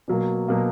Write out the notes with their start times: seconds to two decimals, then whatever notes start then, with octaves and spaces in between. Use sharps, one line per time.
0.08 B2 F#3 A#3
0.48 B2 F#3 A#3